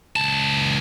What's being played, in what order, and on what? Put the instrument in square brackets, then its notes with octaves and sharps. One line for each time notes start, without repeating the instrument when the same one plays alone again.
[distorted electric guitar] C#2 A5